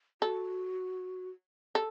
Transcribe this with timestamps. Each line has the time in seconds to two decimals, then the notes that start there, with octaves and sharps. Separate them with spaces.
0.22 F#4 A4
1.75 G4 A4